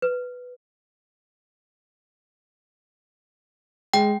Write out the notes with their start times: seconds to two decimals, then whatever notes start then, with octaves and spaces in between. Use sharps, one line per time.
0.02 B4
3.94 G#3 G5